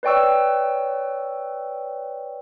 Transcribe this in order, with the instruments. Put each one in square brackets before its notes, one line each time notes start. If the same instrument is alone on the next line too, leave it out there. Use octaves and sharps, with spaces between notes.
[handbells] B4 C#5 D5 G5 C#6 E6